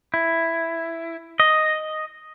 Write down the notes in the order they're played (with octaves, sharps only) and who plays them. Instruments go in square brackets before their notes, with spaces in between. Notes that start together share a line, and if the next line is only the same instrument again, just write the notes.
[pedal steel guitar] E4
D#5